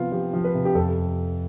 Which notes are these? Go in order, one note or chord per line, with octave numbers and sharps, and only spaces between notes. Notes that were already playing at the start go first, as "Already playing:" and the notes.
Already playing: C3 F3 B3 F4
F3 G4
F3
B4
C3
G4
F2 A4